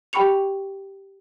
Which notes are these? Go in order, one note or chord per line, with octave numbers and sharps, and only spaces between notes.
G4 G5 B5 C#6 C#7 F7